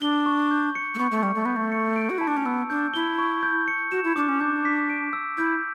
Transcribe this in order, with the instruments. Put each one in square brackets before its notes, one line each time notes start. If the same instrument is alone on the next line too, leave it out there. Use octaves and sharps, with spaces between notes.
[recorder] D4 [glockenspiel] G7
[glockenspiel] C#6
G6
C#7
[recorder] A3
[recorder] B3 [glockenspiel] C#6
[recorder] A3
[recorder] G3 [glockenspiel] C#6
[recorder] A3
[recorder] B3 [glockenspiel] G6
[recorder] A3
[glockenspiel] C#7
D7
[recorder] F#4
[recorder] E4 [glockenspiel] A5
[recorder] D4
C#4
[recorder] B3 [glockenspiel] E6
[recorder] D4 [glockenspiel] G6
[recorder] E4 [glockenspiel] G7
[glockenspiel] C#6
G6
C#7
[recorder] F#4 [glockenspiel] E7
[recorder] E4
[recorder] D4 [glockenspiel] D6
[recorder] C#4
[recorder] D4 [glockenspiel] G6
[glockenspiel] B6
D7
E6
[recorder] E4 [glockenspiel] G6